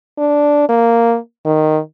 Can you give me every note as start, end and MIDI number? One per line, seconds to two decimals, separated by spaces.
0.18 0.67 62
0.69 1.17 58
1.45 1.79 51